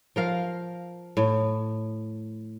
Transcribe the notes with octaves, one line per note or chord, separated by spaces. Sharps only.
F3 A#4 F5
A2